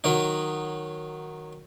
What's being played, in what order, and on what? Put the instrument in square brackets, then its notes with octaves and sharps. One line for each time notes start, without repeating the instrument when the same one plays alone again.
[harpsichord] D#3 F#3 D#4